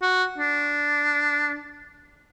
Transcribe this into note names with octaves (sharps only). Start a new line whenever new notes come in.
F#4
D4